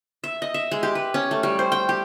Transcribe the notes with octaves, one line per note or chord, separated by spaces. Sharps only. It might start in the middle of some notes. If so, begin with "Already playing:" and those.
E5
D#5
E5
G#3
G4
B4
C#4
A3
G3
C5
G5
G4